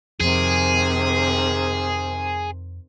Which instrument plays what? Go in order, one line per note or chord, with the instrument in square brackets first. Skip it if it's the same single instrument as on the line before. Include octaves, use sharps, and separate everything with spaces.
[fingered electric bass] F2 [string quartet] C3 D#3 C5 [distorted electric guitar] G#4